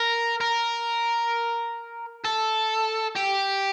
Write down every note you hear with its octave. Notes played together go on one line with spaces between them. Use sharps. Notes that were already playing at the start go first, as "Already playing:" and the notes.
Already playing: A#4
A#4
A4
G4